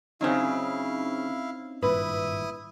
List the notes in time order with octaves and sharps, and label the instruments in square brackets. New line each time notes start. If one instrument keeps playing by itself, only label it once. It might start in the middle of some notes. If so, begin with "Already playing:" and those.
[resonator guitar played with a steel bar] C#3 F#3 [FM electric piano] C4 C#4 D#4 [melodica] E4 F5
[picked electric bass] G#1 G2 A#2 [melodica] E4 D#6 [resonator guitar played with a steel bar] B4